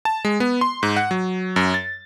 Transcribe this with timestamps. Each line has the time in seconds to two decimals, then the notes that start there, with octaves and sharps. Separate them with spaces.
0.05 A5
0.25 G#3
0.40 B3
0.61 C6
0.83 G#2
0.96 F#5
1.11 F#3
1.56 F#2
1.74 A6